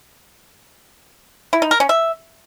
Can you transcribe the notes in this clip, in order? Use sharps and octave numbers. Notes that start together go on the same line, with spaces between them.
E4
D#4
A#4
C#4
E5